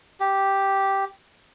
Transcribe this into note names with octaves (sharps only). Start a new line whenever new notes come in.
G4